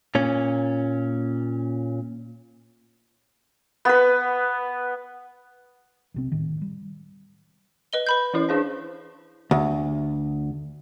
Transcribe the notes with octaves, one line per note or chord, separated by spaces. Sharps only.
A#2 C#4
B3 B4
B1 C3 C4
D2 A2 D#3
G3
B4 D#5 G7
B4 B5 G6
E3 C#4 E4
D4 G#4 C5
D2